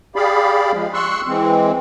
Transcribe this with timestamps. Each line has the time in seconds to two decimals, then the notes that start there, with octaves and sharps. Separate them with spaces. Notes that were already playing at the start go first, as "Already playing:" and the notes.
0.16 G4 G#4 D5 F5 B5
0.73 F3 G#3
0.94 C6 C#6 E6 F#6
1.27 E3 G#3 C4